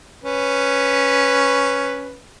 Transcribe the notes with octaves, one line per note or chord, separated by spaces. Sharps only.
C#4 B4